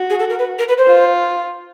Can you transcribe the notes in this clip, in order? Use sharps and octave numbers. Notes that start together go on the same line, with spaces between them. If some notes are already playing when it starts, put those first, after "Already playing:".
Already playing: F#4
G#4
A4
A#4
B4
A#4
B4
C5
F4